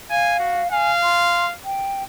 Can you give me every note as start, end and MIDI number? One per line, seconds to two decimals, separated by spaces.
0.10 0.71 77
0.10 0.39 80
0.39 0.62 66
0.71 1.54 77
0.71 0.91 80
1.03 1.46 84
1.65 2.03 79